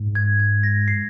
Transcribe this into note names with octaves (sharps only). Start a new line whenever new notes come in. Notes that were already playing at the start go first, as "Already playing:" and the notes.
Already playing: G#2
G#6
G#6
A#6
C7